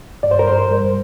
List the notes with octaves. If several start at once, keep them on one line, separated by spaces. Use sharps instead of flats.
G2 D5
C5
A#4
G2 C5
G3